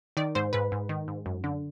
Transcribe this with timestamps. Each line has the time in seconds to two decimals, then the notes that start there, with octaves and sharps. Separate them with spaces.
0.17 D#3 D5
0.35 G#2 C5
0.53 G#2 B4
0.72 G#2
0.89 D#3
1.08 G#2
1.26 F#2
1.44 D3